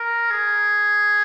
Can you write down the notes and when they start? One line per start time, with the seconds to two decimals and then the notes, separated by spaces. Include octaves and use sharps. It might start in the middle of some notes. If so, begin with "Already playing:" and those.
Already playing: A#4
0.30 G#4